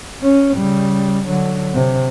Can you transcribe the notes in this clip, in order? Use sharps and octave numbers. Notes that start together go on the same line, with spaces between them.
C#4
C#3 G3
D3 F#3
C3